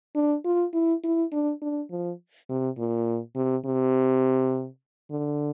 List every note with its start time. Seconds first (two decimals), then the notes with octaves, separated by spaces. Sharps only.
0.16 D4
0.45 F4
0.74 E4
1.04 E4
1.32 D4
1.62 D4
1.91 F3
2.49 C3
2.78 A#2
3.36 C3
3.66 C3
5.11 D3